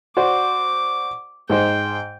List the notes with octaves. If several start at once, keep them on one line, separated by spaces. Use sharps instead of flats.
F#4 C5 D5 D6
G#2 D#4 C5 G5